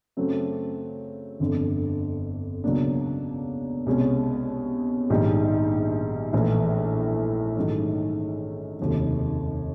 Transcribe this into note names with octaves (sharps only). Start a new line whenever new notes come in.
F#2 C#3 F#3 A3 C4
G1 F2 D3
C#2 B2 F#3 A#3 D4
C2 B2 G#3 C#4
A#1 G#2 D#3 G3
A#1 A2 E3
G#2 D#3 F#3 A3 C#4
F1 D#2 C#3 F#3